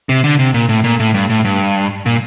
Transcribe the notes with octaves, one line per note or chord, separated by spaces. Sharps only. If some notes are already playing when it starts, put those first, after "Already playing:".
C3
D3
C3
A#2
A2
A#2
A2
G2
A2
G2
A#2